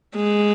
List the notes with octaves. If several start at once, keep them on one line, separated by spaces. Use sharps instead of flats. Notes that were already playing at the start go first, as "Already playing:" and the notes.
G#3